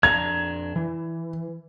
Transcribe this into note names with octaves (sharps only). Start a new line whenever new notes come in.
F2 D4 A#5 G#6
E3